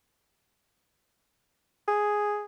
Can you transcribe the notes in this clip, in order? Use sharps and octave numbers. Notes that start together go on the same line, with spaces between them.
G#4